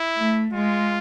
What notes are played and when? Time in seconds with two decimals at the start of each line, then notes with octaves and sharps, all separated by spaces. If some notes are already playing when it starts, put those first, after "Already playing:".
Already playing: E4
0.16 A3
0.53 G#3 F4